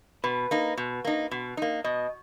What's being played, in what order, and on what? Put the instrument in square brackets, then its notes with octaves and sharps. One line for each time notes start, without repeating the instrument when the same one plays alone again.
[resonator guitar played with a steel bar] B2 [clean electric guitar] B4
[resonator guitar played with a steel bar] A#3 D#4
B2
A#3 D#4
B2
A#3 D#4
[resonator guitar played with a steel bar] B2 [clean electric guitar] D#5